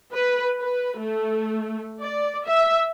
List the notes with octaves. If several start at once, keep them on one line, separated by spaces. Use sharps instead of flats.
B4
B4
A3
D5
E5